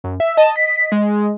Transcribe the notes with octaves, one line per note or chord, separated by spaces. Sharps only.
F#2
E5
D#5 A5
B6
G#3